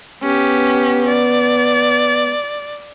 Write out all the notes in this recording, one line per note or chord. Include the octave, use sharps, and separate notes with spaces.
B3 C#4 G4
D5